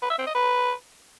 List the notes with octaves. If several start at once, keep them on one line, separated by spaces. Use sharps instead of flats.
B4
E5
C4
D#5
B4